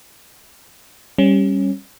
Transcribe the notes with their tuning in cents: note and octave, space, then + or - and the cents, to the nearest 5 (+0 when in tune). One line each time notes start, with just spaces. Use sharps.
G3 +0 C#4 -15